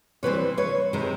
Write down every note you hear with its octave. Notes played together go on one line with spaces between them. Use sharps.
C3 E3 G3 C4 B4 C#5
B4 C#5
C3 D#3 G#3 C4